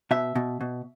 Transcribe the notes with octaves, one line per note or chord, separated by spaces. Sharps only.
B2 E5
B2
B2